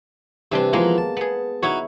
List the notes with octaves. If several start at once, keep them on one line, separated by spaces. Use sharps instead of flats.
C3 E3 G3 C4 D4
E3 F3 G#3 A#3 B3
A5
B3 G#4
D#4 E4 F#4 C#5